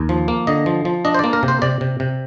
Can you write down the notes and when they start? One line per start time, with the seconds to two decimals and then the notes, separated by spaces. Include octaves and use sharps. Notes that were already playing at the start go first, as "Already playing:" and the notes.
Already playing: D#2
0.09 F3
0.28 A#3
0.47 D3 D#5
0.66 F3
0.85 F3
1.05 D4 D#5
1.14 C5
1.19 A#3 D5
1.33 A#4
1.43 C3
1.48 C5
1.62 C3 D5
1.81 C3
2.00 C3